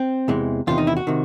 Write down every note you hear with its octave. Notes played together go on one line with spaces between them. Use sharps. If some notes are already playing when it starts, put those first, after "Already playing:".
Already playing: C4
E2 C3 E3 G#3
E2 C3 D#3 F4
D#4
E4
F#4
C3 D#3